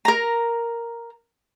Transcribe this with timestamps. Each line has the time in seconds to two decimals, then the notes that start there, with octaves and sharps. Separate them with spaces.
0.05 A#4 A#5